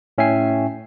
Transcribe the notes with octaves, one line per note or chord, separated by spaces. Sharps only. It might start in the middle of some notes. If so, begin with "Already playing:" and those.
A2 C#4 E5 G5 G#5 C7